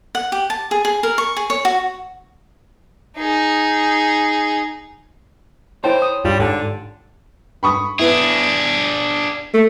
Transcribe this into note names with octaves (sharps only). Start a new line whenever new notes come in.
F#5
G4
A5
G#4
G#4
A#4
C#6
G#4
C#5
F#4
D#4 G#4
E4 C5 C#5 G5 A5 C6
D#6
G2 G3 F4 G4
G#2 D3 G4 A5
B5 C#6 D#6
B3 D4 E4 G#4
A3